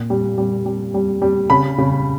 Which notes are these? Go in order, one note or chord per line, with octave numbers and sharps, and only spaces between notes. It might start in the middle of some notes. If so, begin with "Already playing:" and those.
Already playing: A#2
G3
G3
G3
G3
G3
C#3 B5
C#3